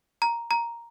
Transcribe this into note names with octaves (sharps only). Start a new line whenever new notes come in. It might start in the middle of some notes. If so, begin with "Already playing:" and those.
A#5
A#5